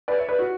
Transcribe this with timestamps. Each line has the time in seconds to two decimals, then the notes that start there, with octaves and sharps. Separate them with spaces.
0.08 B4 D5
0.18 C#5 E5
0.29 B4 D5
0.39 F#4